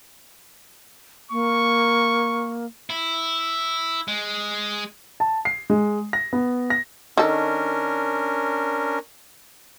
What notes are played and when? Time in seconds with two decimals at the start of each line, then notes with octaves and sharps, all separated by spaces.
1.31 A#3 C#6
2.90 E4
4.08 G#3
5.20 A5
5.45 C7
5.70 G#3
6.13 A#6
6.33 B3
6.70 A#6
7.18 D#3 C#4 D4 A4 A#4